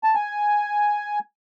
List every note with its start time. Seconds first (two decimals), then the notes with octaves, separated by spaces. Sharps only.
0.04 A5
0.15 G#5